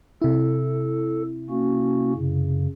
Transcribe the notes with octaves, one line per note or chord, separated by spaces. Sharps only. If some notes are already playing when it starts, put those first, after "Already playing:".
C3 E4 A4
A#3 C#4 F#4
F#2 C#3